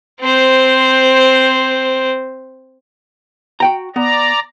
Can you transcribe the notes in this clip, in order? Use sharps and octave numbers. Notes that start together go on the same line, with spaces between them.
C4 C5
F#4 G5 A#5
B3 D5 A#5